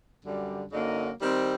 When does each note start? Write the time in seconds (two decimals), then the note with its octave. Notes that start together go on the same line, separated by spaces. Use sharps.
0.24 F#2 D3 G3
0.72 F#2 D3 F#3 A#3 D#4
1.20 D#3 G3 C4